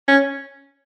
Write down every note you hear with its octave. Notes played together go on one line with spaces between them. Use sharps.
C#4